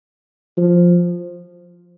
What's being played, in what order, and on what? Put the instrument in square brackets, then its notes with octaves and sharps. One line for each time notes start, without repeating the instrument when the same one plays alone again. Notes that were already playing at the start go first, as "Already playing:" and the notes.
[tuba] F3